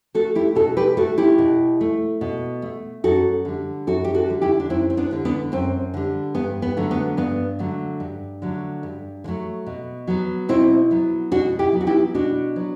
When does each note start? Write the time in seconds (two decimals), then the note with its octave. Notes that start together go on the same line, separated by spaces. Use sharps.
0.14 A3 F#4 A4
0.35 E4 G4
0.55 B2 F#4 A4
0.77 G4 B4
0.97 A3 F#4 A4
1.18 E4 G4
1.38 B2
1.81 A3
2.21 B2
2.62 A3
3.04 F#2 F#4 A4
3.45 D3 G3
3.87 F#2 F#4 A4
4.04 G4
4.14 F#4 A4
4.28 D3 G3
4.42 E4 G4
4.60 D4
4.70 F#2 C4 E4
4.90 C4
4.97 B3 D4
5.11 D3 G3
5.25 B3 D4
5.52 F#2 C4
5.94 D3 G3
6.35 G2 B3
6.62 B3
6.77 D3 F#3 A3
6.91 B3
7.17 G2 B3
7.59 D3 F#3 A3
8.00 G2
8.42 D3 F#3 A3
8.83 G2
9.24 D3
9.28 F#3 A3
9.66 B2
10.07 F#3 B3
10.49 B2 C4 E4
10.91 F#3 B3
11.32 B2 D4 F#4
11.59 E4 G4
11.72 F#3 B3
11.81 F#4
11.87 E4 G4
12.14 B2 D4 F#4
12.56 F#3 B3